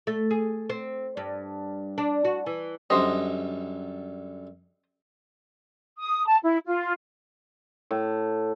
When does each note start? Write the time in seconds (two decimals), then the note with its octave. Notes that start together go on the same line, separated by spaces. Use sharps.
0.07 A3
0.31 G#4
0.70 C4
1.17 G2
1.98 D4
2.25 F#4
2.46 E3
2.90 F#2 D3 G3 C5 D#5
5.99 D#6
6.27 A5
6.43 E4
6.66 F4
7.91 A2